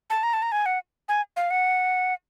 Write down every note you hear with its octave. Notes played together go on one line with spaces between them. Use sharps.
A5
A#5
A5
A#5
G#5
F#5
G#5
F5
F#5